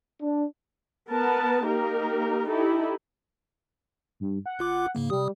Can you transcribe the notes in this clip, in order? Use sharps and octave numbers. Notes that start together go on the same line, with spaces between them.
D4
B3 A#4 B4 A5
A#3 D#4 G4 A#4
D#4 E4 G4 A4
G2
F#5
G1 F4 D6
G#2 C#3 A#3
C3 G3 D#6